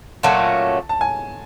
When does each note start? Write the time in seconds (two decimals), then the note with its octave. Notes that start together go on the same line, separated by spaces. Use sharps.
0.23 A#2 F#3 A3 C#4 A5
0.89 A5
1.01 G#5